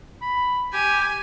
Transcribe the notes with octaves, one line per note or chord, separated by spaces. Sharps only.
B5
G4 G#5